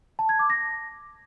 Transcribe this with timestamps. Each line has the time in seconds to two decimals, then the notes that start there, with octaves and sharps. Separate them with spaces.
0.19 A5
0.29 G#6
0.39 D6
0.50 A#6